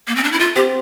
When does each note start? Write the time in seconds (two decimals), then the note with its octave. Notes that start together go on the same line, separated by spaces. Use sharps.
0.07 A#3
0.16 C4
0.24 D4
0.32 E4
0.39 A3 F4
0.56 C4 G4